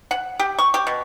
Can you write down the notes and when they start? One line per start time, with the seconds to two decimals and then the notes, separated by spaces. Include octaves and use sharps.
0.11 F#5
0.39 G4
0.59 C#6
0.74 G4
0.87 B2